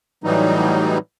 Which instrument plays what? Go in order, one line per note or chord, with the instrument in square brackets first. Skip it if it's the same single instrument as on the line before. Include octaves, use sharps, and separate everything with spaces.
[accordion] A2 E3 F#3 G3 D#4